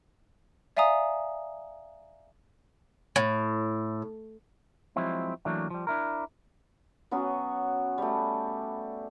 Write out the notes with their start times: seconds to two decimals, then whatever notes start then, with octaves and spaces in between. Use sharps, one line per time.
0.77 D5 E5 F5 G#5 A#5 D#6
3.16 A2
4.96 F3 F#3 G#3 C4 E4
5.45 E3 F#3 A3 A#3 D4
5.70 F3 G3
5.87 D4 E4 A#4
7.11 F#3 B3 C#4 F#4
7.98 G3 A3